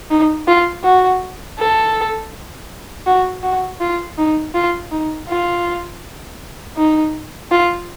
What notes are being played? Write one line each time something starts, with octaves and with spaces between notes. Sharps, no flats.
D#4
F4
F#4
A4
F#4
F#4
F4
D#4
F4
D#4
F4
D#4
F4